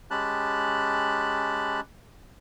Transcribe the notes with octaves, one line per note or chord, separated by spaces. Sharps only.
G#3 C#4 G4 A5 B5 F#6